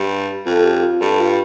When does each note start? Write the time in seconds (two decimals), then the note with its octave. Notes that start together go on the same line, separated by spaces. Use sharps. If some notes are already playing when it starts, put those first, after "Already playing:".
Already playing: G2
0.46 F2 A4
0.64 G4
0.83 F4
1.01 G2 A4
1.20 F4